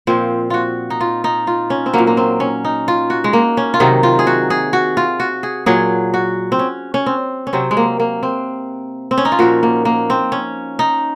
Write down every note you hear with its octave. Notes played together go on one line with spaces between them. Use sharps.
A#2 F3 C4
F4 F#4
D#4
F4
D#4
F4
C#4
C4
A#2 F#3 A#3
A#3
C4
C#4
D#4
F4
F#4
G#3
A#3
C#4
F4
C3 D#3 F#3 D#4
F4
G#4
F#4
G#4
F#4
F4
F#4
G#4
A#2 F#3 G#4
F#4
C4
C#4
C#4
C4
C#4
C3 F#3 C4
G#3
A#3
A#3
C4
C4
C#4
D#4
F4
A#2 F3 F#4
A#3
A#3
C4
C#4
D#4